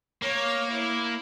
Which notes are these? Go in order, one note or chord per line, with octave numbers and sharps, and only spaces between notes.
A#3 C#5
E4